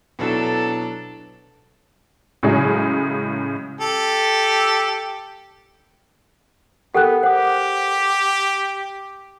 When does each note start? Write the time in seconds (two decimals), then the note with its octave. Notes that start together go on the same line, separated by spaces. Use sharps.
0.19 B2 F#3 D4 E4 A4
2.43 A2 C#3 F#3 G#3 G#4
3.81 G4 A4
6.94 B3 G4 A4 A#4 F#5 G5 F#6
7.23 G4 C5 F#5 D#6